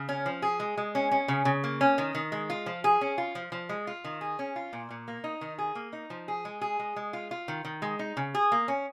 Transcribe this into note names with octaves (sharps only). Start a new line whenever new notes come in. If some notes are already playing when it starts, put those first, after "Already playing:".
Already playing: C#3
C#4
F3
G#4
G#3
G#3
C#4
C#4
C#3
C#3
A#3
C#4
D#3
D#3
G#3
F4
F3
G#4
C#4
F4
F3
F3
G#3
F4
D#3
G#4
C#4
F4
A#2
A#2
A#3
D#4
D#3
G#4
A#3
D#4
F3
G#4
G#3
G#4
G#3
G#3
F4
F4
D#3
D#3
G#3
D#4
C#3
G#4
A#3
C#4